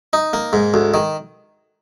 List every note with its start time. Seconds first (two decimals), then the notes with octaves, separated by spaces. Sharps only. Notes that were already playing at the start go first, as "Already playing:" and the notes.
0.13 D#4
0.33 A#3
0.53 G#2
0.74 D2
0.94 D#3